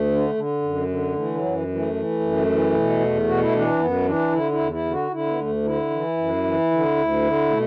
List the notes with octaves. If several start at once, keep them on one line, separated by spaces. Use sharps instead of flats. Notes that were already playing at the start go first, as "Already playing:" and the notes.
Already playing: D2 A3
D3
D3
F#2
D3
E3 A3
F#3
F#2
E3
A3
E3
F#2
E3
B2
E2
B2 F#4
E4
E3 D4
F#2 B3
E3 D4
D3 E4
E4
E2
E4
D3
F#4
D3 E4
B3
D2 A3
D3 E4
E3
F#2
E3
D3
D2
D3
B2 A3